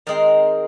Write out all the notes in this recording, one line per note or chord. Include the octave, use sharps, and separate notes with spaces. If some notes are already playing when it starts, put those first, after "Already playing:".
D#3 G#3 C4 A#4